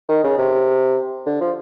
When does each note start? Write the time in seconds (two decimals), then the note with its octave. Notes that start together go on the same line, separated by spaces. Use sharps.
0.09 D#3
0.24 C#3
0.38 C3
1.26 D3
1.40 F3